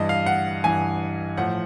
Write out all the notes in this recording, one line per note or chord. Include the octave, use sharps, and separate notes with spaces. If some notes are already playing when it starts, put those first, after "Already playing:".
Already playing: G2 E3 D#5
F5
F#5
G2 E3 G#5
A2 F3 F#5